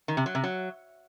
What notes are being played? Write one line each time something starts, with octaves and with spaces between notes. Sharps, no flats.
D#3
C3
F#3
C3
F#3